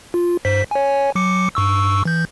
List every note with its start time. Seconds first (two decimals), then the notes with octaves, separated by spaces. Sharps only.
0.14 F4
0.45 G2 C5 B6
0.71 C#5 G#5
1.15 F#3 D6 C#7
1.55 G2 C#6 E6
2.05 E3 G6